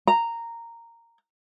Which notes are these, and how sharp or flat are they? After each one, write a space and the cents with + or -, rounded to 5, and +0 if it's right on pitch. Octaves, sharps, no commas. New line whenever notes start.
A#5 -10